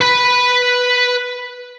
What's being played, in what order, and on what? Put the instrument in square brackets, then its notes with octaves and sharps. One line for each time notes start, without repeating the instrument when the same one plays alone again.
[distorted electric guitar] B4 B5